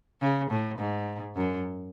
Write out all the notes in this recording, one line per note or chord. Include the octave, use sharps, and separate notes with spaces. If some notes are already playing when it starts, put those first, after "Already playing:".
C#3
A2
G#2
F#2